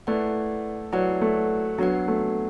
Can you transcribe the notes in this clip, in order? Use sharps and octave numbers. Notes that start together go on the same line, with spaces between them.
A3 E4 B4 D5 F#5
F#3 E4 B4 D5 F#5
A3
F#3 B3 D4 F#4 B4 F#5
A3